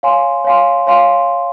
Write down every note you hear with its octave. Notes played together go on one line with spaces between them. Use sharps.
C#5 F5 G#5 C6
C#5 F5 G#5 C6
C#5 F5 G#5 C6